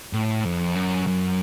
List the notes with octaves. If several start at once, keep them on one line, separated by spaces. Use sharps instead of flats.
A2
F2
F#2
F#2